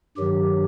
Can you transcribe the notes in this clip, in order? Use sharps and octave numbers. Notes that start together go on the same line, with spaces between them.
G2 D#3 F#3 G4